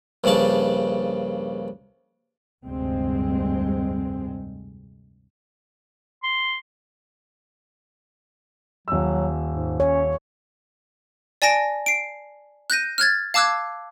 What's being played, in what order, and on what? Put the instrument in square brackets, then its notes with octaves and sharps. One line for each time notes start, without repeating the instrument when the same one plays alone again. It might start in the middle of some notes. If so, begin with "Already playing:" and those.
[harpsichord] A#1 G2 C#3 D5 A5
[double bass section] F1 D2 G2 G#3 C4
[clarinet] C6
[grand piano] D#1 E6 [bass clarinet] F#3
[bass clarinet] G#2
[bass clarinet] C#4 [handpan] C#5
[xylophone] D5 G#5 A5 A#6 D7
C7 D7
F#6 G6 A#6 D#7
F6 F#6 G#6 A6
F5 A5 D6 E6 F#6 G#6